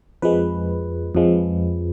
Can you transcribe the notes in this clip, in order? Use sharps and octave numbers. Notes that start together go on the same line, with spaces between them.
F2 F3 G#3 B4
F2 F3 G#3